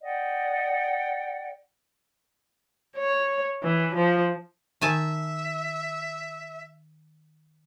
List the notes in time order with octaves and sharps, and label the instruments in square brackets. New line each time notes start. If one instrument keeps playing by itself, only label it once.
[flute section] D5 D#5 F#5 G5
[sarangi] C#5
E3
F3
[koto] D#3 G#5 A5 [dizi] E5